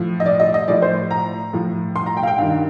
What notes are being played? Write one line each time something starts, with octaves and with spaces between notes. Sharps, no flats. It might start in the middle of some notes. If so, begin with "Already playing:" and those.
Already playing: A2 F3
D#5
D5
D#5
D#5
A2 F3 D5
C5
A#5
A2 F3
C6
A#5
G5
F5
G5
G2 D#3 F5